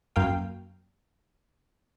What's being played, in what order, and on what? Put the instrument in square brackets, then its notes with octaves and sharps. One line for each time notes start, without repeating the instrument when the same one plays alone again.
[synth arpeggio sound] F#2 A#3 F5 G5